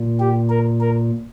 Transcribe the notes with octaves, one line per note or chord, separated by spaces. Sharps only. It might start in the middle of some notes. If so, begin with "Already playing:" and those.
Already playing: A#2
G4
A#4
A#4